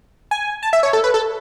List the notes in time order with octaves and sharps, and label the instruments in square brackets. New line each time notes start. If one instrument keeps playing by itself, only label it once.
[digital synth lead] G#5
A5
E5
C#5
A4
B4
A4